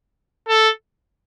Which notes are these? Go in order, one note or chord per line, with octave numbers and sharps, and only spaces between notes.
A4